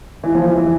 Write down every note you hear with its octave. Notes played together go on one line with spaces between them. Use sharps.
E3
F3
E3
E3